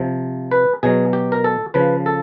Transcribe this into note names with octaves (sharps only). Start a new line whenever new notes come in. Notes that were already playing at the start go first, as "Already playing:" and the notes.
Already playing: C3 F3
B4
B2 F#3 G#4
G4
A#4
A4
C#3 F3 B4
A4